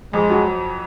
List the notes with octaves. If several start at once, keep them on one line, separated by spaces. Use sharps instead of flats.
F2 G#3
F#3